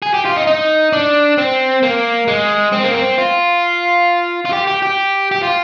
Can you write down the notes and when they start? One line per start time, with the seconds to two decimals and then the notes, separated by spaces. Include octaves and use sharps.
0.02 G#4
0.14 G4
0.25 F4
0.36 D#4
0.47 D#4
0.93 D4
1.38 C4
1.83 A#3
2.28 G#3
2.72 C4
2.83 A#3
2.94 C4
3.18 F4
4.45 F4
4.53 G4
4.67 G4
4.83 G4
5.31 G4
5.43 F4